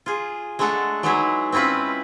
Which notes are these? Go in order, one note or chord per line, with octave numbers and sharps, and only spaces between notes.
F4 G#4
G#3 A3 D4 A4 F#5
F#3 G#3 B3 D#4 E4 G#4
C4 C#4 E4 F4 B4